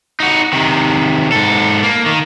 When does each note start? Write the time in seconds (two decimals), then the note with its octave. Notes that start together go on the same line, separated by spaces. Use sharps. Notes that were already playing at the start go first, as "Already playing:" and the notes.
0.20 D#4 F#4
0.53 C3 D#3
1.32 G#2 A4
1.83 A#3
2.06 D#3